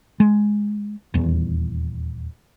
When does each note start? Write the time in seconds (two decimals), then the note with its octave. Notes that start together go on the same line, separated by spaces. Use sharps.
0.20 G#3
1.14 D#1 E2